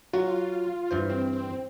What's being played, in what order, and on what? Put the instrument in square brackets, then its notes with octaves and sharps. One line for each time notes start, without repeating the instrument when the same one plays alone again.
[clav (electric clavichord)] F#3 F#4 [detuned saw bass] F4
[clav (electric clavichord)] G2 E3 C5
[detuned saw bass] C4